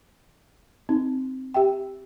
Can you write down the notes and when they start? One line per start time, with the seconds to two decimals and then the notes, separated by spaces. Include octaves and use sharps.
0.89 C4 D#4
1.54 G4 E5 G5